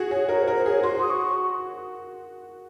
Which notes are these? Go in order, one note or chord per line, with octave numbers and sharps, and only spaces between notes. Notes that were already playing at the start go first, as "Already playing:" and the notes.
Already playing: F#4 G#4
G#4 C#5
A#4 C#5
C5
A#4
C5
G#4 C#5
F#4 C6
D#6
C#6